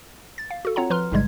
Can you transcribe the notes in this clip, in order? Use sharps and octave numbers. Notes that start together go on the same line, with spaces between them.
A6
F5
F#4 A4
C4 F4 C#5 F#5 A#5
F3 B4 A#5 C6 F6
A1 G#2 C#3 G3 G#3 G#6